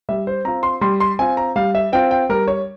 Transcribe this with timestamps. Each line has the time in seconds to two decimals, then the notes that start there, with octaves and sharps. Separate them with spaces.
0.09 G3 E5
0.27 C5
0.44 C4 F4 A#5
0.63 C6
0.81 G3 C6
1.00 C6
1.19 C4 F4 G#5
1.37 A#5
1.56 G3 F5
1.75 E5
1.93 C4 F4 G5
2.11 G5
2.29 G3 A#4
2.48 C#5